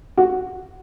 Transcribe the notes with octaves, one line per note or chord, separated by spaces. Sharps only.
F#4